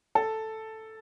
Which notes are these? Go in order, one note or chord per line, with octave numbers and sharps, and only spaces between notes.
A4